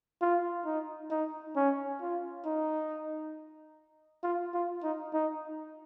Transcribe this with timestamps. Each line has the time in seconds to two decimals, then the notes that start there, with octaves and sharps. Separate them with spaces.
0.21 F4
0.65 D#4
1.10 D#4
1.56 C#4
2.01 F4
2.46 D#4
4.23 F4
4.54 F4
4.83 D#4
5.13 D#4